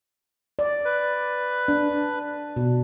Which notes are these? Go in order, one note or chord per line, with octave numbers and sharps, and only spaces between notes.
D5
B4
D4
B2